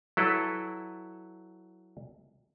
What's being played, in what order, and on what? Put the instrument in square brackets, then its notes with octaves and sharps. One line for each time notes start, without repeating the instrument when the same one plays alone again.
[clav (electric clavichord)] F#3 E4 A4 B4